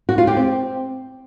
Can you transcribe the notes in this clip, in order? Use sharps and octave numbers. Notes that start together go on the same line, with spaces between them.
F#4
F4
G4
C4